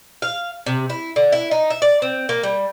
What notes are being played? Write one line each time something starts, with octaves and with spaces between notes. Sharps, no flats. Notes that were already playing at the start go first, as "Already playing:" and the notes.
F5
C3
E4
D3
E4
D#4
E5
D5
C4
A#3
G3